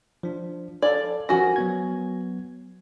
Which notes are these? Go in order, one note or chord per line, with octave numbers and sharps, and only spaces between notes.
F3 D4
A4 D5 F5 G#6
F3 C#4 F#4 A#4 A#6
F#3 B3 G#6